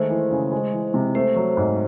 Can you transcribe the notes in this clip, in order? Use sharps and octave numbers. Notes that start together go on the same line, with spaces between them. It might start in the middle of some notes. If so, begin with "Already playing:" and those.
Already playing: D#3 G#3 A3 C5
E3
C#3
G#3
E3
C3
A3 C5
F#3
G#2